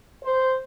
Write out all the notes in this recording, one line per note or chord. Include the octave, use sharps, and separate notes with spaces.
C5